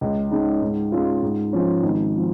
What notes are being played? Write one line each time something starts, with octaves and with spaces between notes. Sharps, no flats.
C#2
C#3 G#3 D#4
G#2
G#3 C#4 F4
G#2
F3 C#4
G#1
F3